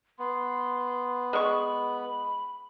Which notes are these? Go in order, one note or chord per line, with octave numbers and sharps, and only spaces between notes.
B3 C6
G#3 B5 C#6